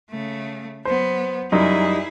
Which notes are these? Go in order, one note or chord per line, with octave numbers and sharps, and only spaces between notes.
C#3 A3
F#3 B3 C5
F#2 G3 D#4 E4 G#4